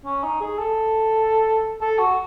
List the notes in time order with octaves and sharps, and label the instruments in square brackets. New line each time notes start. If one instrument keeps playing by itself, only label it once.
[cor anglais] C#4
D#4
G#4
A4
A4
F#4